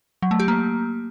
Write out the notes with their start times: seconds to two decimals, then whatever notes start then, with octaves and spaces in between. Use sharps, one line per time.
0.22 F#3
0.31 A3
0.40 G4
0.48 A#3